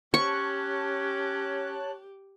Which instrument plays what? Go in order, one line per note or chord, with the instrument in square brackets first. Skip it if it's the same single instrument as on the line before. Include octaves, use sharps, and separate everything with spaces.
[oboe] C#4 [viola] G4 [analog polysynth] C#5 A5 F#6 [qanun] C#6